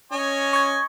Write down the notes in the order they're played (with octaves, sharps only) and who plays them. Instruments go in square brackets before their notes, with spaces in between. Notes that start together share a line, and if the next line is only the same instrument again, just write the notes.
[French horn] C#4 [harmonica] C#5 D#5 G#5
[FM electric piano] C#6 G#6